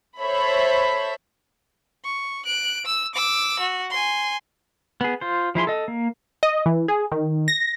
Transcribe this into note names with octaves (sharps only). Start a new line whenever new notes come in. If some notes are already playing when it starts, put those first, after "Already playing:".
A4 C5 C#5 E5 B5
C#6
F#6 D7
E6
D6 E6
F#4
G#5 C6
B3 G#4
F4 C5
F3 E4 G#4 C6
A4 D#5
A#3
D#5
E3
G#4
D#3
A#6